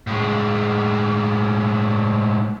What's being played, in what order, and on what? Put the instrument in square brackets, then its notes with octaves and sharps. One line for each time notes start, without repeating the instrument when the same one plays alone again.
[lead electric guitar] A2 G#3